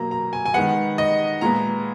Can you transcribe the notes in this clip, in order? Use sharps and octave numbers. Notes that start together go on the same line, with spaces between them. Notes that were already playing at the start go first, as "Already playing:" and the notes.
Already playing: B2 F#3 A#3 A#5
A#5
G#5
G#5
D#3 G#3 B3 F#5
D#5
A#2 G#3 B3 A#5